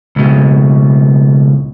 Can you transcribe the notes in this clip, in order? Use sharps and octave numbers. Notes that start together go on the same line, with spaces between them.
C#2 B2